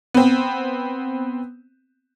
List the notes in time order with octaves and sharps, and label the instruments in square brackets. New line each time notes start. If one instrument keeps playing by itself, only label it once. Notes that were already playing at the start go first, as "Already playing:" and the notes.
[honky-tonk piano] B3 C4